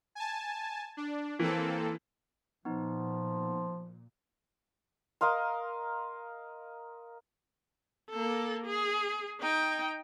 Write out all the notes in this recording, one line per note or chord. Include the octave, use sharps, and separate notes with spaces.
G#5 A5
D4
E3 A#3 C4 A4
A#2 F3 B3 D#4
A#4 D#5 F5 C6
A#3 A4
G#4
D#4 G5